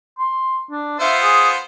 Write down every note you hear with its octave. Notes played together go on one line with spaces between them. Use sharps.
C6
D4
B3 F4 C5 E5
G#4